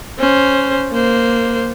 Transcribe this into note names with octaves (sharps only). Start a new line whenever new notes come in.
C#4 C5
A#3 C5